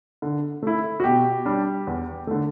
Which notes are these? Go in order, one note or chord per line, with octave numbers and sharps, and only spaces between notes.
D3
A3 E4
F#4
B2 G4
G3 D4
E2
D3 A3